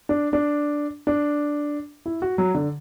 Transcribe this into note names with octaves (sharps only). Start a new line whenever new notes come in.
D4
D4
D4
E4
F#4
F#3
D3